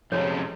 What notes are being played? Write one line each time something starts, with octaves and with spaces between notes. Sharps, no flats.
F2 C3 F3 G#3 C#4 C#5